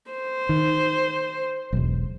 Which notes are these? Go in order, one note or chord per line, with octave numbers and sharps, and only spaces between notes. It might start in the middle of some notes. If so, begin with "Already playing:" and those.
C5
D#3
E1 B1